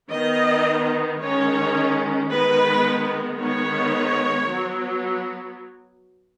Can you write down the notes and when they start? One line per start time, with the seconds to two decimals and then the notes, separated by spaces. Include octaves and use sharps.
0.10 D#3 B3 D#5
1.19 D#3 G#3 C#4 C#5
2.29 D#3 G#3 B3 B4
3.38 D#3 G#3 B3 C#5
4.47 F#3 B3